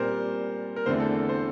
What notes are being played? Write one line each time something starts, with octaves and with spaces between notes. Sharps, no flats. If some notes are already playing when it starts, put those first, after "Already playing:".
Already playing: A#2 G3 C4 A#4 C5
A#4
E2 D3 A3 C4 C5
A4
C5